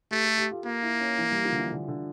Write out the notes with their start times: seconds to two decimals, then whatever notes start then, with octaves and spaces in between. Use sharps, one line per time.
0.11 A3 G4
0.24 A4
0.38 G4
0.51 F4
0.64 A#3 F4
0.83 E4
1.00 C#4
1.18 E3
1.31 G3
1.45 F3
1.52 D3
1.59 E3
1.72 D3
1.88 D3